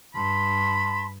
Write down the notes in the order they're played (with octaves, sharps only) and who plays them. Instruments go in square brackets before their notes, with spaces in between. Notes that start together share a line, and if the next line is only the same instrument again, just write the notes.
[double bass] G2 [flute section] A5 C6 [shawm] B5